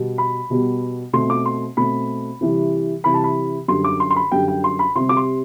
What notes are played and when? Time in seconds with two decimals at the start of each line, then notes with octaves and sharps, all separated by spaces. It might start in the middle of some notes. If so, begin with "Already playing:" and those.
Already playing: B2 G3 B3
0.18 B5
0.50 B2 G3 B3
1.13 B2 A3 C4 C6
1.30 D6
1.46 C6
1.77 B2 A3 C4 B5
2.41 C3 E3 G3
3.04 C3 E3 G3 B5
3.14 A5
3.24 B5
3.68 F#2 D3 G3 C6
3.84 D6
4.00 C6
4.11 C6
4.16 B5
4.32 F#2 D3 G3 G5
4.48 G5
4.64 C6
4.79 B5
4.95 C3 G3 C4 C6
5.09 D6
5.17 C6